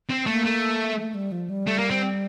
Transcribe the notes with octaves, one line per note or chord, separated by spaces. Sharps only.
C4
A3 A#3
A3
A3
G3
F3
G3
A3
A#3
C4